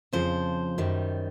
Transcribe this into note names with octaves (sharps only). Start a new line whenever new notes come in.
F2 C#3 F3 C5
F#2 D#3 G3